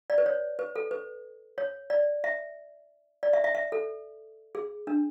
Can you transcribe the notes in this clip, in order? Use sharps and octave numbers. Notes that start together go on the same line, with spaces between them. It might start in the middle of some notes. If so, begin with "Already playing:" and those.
D5
B4
C#5
B4
A4
B4
C#5
D5
E5
D5
E5
E5
E5
A4
G#4
D4